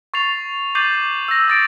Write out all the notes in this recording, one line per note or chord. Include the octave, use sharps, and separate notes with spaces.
C#6 A6 C7 F7
D6 G6 A6 C7 D#7 F#7
E6 A#6
D#6 A6 D7